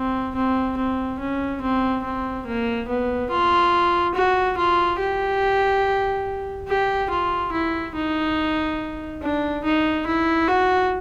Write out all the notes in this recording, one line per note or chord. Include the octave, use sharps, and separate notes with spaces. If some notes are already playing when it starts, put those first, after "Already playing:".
Already playing: C4
C4
C4
C#4
C4
C4
A#3
B3
F4
F#4
F4
G4
G4
F4
E4
D#4
D4
D#4
E4
F#4